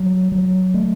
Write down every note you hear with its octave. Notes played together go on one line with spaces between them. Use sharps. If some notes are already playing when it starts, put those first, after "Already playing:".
Already playing: F#3
F#3
A3